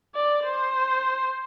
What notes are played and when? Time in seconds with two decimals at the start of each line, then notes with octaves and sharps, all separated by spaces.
0.15 D5
0.44 C5